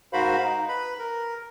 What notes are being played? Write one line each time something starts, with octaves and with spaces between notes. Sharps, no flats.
G#2 F#4 A#4 C5 F5 B5
D#4
B4 B5
A#4